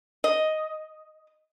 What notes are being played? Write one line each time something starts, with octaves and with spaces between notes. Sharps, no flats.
D#5